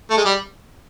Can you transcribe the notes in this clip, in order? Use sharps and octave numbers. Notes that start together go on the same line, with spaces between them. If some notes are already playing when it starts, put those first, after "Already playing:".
A3
G#3
G3